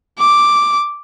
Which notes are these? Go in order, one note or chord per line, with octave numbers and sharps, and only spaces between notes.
D6